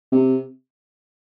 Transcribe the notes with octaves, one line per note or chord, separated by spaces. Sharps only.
C3